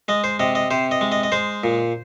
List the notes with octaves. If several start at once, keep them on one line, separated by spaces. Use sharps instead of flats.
G#3 D#5
C5
C3 D#5
D#5
C3 C5
D#5
G#3
D#5
D#5
G#3 C5
A#2